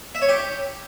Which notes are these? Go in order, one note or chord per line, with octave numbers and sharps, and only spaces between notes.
E5
C#5
G4